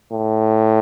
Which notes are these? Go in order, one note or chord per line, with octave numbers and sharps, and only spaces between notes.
A2